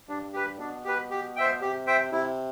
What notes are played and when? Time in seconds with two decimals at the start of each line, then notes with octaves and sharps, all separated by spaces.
0.08 G2 D4
0.34 G4 B4
0.59 B2 D4
0.85 G4 B4
1.11 G4
1.36 C5 E5 G5
1.61 C3 G4
1.87 C5 E5 G5
2.12 C3 E4